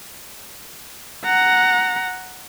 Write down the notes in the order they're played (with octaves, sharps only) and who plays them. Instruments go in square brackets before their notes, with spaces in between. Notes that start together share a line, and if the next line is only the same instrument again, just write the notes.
[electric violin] F#5 A#5